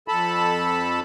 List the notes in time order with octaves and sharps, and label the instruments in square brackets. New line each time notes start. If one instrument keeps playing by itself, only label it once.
[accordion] F2 A4 A5 B5